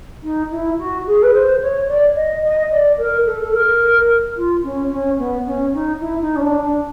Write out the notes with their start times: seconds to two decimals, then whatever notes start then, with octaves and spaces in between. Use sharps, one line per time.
0.23 D#4
0.50 E4
0.78 F#4
1.06 G#4
1.22 B4
1.33 C5
1.61 C#5
1.87 D5
2.15 D#5
2.43 D#5
2.70 D5
2.97 A#4
3.25 A4
3.43 A4
3.52 A#4
4.36 F4
4.62 C#4
4.90 C#4
5.17 B3
5.45 C#4
5.73 D#4
6.00 E4
6.20 D#4
6.36 C#4
6.41 D4
6.62 D4